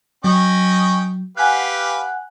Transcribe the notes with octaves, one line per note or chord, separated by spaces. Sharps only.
F#3 C#4 D#5 G5
G4 B4 F5 F#5 G#5 F#6